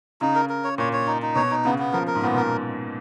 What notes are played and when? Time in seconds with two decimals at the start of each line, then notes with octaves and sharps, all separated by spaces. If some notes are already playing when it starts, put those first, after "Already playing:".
0.21 C#3 D#4
0.35 A#4
0.49 A#4
0.64 C#5
0.78 A#2 C#5
0.93 C#5
1.07 D#4
1.22 D#4
1.35 B2 C#5
1.51 D#4
1.65 C#3 B3
1.79 B3
1.93 F3 A#4
2.07 A#4
2.15 G#2
2.22 A#2 B3
2.34 B2 A#4